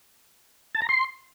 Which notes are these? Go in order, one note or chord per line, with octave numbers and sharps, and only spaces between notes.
A5
A#5
C6